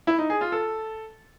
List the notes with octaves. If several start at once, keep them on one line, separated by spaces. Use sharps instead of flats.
E4
D#4
G#4
F4
A4